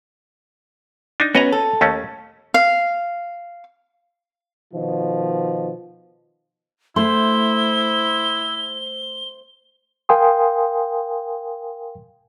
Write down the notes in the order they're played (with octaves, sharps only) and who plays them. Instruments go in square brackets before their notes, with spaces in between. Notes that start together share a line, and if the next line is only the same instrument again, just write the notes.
[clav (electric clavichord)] D4 D#4
[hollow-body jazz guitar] B3 C#4 [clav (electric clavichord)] F#4 D#5 A#5
[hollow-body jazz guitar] A4
[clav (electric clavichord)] D#2 A3 C#4
[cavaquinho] F5
[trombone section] B2 D#3 F3
[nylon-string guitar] A3 [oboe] E4 [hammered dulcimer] C5 [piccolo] G7
[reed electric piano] A#4 F5 G5 G#5 C6 D#6